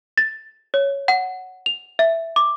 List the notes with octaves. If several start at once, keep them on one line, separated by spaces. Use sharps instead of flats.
A6
C#5
F#5
F7
E5
D6